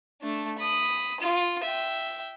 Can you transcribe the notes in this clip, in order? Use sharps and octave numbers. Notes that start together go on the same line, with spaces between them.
A3 D4
B5 D#6
F4
E5 G5